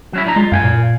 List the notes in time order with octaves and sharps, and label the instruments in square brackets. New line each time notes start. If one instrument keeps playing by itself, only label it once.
[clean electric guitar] F#3 C#4 E4
A2 D4 A#5
[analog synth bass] G#3 [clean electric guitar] F4
[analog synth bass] F#2 [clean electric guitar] F5 G5 G#5
[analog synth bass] A#2